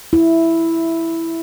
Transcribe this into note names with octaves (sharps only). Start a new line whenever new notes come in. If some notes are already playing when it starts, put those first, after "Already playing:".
E4